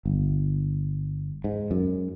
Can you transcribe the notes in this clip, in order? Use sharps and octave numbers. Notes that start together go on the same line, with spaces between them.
G1
G#2
F#2